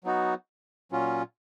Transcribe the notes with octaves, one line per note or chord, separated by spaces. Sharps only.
F#3 B3 D#4 F#4
A#2 F#3 C#4 F4